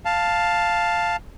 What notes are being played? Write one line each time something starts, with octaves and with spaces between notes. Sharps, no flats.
F5 A5